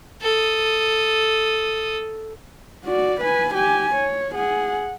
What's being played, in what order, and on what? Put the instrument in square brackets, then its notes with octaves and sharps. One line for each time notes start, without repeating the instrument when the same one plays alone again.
[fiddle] A4 D#6
[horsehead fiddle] F#4 D5
B4 G#5
G4 G#5
C#5
G#4 F#5